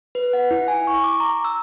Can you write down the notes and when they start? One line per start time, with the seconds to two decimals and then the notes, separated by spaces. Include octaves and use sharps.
0.15 B4
0.33 F#5
0.51 E4
0.68 G#5
0.87 C#6
1.04 D6
1.20 A#5
1.45 E6